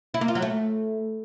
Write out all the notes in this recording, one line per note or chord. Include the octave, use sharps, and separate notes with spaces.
E4
A#3
F4
F#3
A3